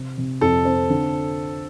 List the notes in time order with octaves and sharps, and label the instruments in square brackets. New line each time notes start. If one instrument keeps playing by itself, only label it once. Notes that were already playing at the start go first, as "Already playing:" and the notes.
Already playing: [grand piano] C3 C4
C3
[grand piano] F2 [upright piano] A4
[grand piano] C4
D3